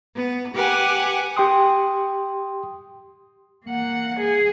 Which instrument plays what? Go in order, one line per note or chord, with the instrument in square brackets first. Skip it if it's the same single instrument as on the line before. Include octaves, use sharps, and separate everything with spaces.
[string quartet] B3
G4 B4 F#5 G#5
[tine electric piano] G4 G5 C6 D#6
[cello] A#3 F#5
G#4